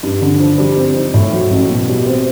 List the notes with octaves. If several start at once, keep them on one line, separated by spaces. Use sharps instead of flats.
G2
D3
F3
G3
C4
D#4
A2
F#3
A1
B2
G3
C4